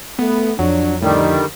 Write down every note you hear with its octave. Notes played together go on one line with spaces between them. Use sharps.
A3 B3
F2 F#3 D4
A2 D3 D#3 G3